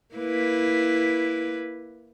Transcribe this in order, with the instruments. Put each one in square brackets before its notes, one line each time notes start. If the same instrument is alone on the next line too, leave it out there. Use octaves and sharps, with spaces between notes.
[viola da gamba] A#3 E4 B4